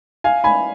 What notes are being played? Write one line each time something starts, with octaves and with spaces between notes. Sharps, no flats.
F5 G#5
G#5 B5